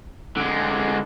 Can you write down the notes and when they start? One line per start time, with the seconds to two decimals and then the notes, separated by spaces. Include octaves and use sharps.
0.37 D3 G#3